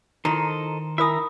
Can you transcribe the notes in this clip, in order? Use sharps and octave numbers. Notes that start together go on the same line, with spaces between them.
D#3 E4 F4 A4 C5 D#5 A#5
E4 A#4 E5 G#5 A#5 B5 D#6